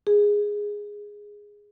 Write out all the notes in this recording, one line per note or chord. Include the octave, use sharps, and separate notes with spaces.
G#4